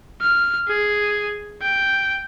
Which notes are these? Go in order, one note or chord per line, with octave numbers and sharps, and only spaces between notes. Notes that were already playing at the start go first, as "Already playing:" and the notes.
F6
G#4
G5